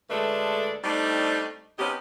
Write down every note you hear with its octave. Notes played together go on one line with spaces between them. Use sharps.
D2 G#3 A3 D4 A4 B4
G3 A3 C4 D4 D#4
C3 B3 C#4 D#4 G4